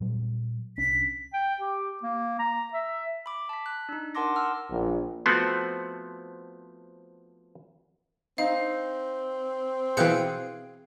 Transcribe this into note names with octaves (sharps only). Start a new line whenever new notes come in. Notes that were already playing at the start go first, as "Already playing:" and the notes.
A#2 F#3 G3
C2 C#4 D4 B6
G5
G4
A#3
A#5
E5
B5 D6
A5 B6
F#6
D4 D#4
A#4 F#5 A5 C6 D6 A#6
F#5 A5 E6 F6
A#1
F3 A3 B3 C4 F#4
C4 D#4 F5
B2 E3 G#4 F5 G5 F#6 G6 C#7